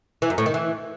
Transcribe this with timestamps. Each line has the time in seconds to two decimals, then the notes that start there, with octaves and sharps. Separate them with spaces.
0.22 E3
0.30 F#2
0.38 A2
0.46 D#3
0.54 E3